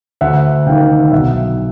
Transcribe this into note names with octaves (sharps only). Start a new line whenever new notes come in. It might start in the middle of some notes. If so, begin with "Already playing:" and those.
D2 E5 F#5
C3 D#3 F5 G5
B1 E5 F#5